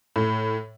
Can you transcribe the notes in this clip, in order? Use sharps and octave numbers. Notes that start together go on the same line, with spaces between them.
A2